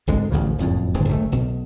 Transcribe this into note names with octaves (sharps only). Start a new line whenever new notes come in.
G#1 D2 D3 G#3
A1 D2 C#3 F3
F#1 F2 A2
D1 G1 D#2 G#2
F#1 D3 A3
B1 B2